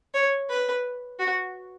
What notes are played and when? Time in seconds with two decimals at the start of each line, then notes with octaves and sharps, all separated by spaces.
0.14 C#5
0.50 B4
1.19 F#4